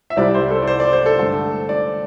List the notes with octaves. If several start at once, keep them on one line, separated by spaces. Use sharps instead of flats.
E5
C2 C3 G3 C4 E4 D5
C5
A4
D5
C5
D5
C5
A4
G2 D3 A3 A4
D5